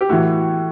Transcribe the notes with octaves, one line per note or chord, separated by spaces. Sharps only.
G4
A2 E3 F#4